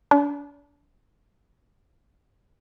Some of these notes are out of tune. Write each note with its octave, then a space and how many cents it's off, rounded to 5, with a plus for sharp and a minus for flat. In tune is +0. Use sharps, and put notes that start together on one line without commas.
D4 -35